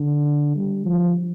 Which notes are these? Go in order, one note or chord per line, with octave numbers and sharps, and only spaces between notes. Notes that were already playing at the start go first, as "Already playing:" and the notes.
Already playing: D3
G3
F3